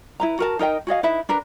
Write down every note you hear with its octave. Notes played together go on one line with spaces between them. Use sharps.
E4 B4 A#5
F#4 A#4 A5
D#4 A#4 D#5 G5
F#4 G#4 D#5 F5
D#4 E4 B4 E5
D4 A#4 B4